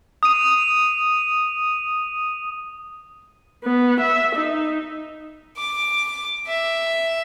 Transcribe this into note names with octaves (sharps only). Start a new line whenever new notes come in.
D#6 D#7
B3
E5
D#4
D6
E5